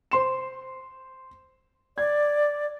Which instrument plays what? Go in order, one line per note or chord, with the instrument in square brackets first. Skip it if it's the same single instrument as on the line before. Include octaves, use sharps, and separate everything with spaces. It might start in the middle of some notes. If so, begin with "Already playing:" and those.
[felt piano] C5 C6 E7
[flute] D5 [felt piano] G#6